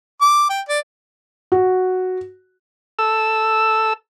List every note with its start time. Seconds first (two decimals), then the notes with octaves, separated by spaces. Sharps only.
0.21 D6
0.49 G5
0.69 D5
1.52 F#4
2.99 A4 E6